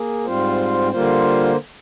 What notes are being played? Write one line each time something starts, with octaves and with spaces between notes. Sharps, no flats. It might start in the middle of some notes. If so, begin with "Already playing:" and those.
Already playing: A#3 G#4
G#2 G3 C4 F4 C5
D3 G3 A#3 F4 C5